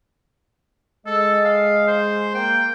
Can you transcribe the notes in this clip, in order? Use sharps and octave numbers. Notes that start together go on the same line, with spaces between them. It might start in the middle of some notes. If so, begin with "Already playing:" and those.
G#3 A4 D#5
F5
C5
A#3 G5